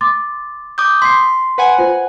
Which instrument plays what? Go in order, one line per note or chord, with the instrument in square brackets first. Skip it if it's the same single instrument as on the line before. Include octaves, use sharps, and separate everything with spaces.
[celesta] C6 D6 A6
[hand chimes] D6 D#6 G6
[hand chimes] C6 [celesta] B6 C7
[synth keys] B4 F#5 G#5
[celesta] F4 C5